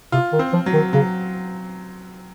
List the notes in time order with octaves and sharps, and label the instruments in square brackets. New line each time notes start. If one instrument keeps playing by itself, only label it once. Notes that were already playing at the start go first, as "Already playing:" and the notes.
[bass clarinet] C3 [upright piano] F4
[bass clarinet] D#3
[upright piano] C4
[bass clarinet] F3
[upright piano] F#3
[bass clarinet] D#3
[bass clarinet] C#3 [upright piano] F#3